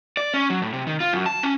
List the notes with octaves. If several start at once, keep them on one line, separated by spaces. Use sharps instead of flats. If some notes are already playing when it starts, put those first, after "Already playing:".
D5
C#4
F#3
A2
C3
D#3
F4
F#2
A5
C#4